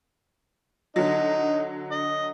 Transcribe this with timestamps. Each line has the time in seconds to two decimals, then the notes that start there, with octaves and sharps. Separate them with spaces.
0.96 D3 F#3 D#4
1.92 D#5